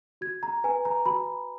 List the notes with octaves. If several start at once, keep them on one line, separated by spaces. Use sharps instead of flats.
F#4 G#6
A#5
B4 G#5
A#5
F#4 B5